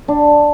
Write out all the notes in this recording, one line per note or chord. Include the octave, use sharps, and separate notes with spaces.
D4